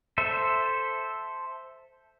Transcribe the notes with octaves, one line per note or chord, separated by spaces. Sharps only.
A4 C5 E5